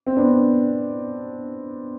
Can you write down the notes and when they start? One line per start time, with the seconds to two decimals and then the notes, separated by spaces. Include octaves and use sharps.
0.07 C4
0.17 B3 D4